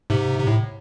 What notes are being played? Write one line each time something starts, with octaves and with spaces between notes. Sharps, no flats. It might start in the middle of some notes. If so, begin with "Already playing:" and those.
G#2 C3
C3
A2